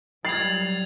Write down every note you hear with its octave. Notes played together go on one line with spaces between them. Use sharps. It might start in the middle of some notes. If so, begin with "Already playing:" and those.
F#3 G3 G#6 A6 C7 F7 F#7